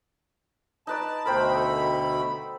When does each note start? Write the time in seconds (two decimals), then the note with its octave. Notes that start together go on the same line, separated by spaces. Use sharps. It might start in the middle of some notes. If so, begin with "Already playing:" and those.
0.87 D#4 B4 D5 A5
1.26 D2 B2 A#4 C5 G5 B5
1.55 A4